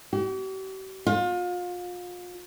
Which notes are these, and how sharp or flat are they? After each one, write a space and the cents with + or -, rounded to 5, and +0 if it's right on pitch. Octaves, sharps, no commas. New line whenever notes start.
G4 -45
F4 +35